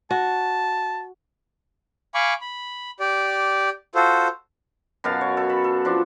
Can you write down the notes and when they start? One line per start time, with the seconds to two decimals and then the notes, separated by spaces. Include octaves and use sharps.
0.11 F#4 A5
2.15 F5 G#5 B5 C#6 D6
2.41 B5
3.00 G4 D5
3.95 F4 F#4 A4 C5
5.04 F#2 B2 F5 A5
5.21 C#5
5.37 A4
5.50 B5
5.64 A4
5.85 F3 D4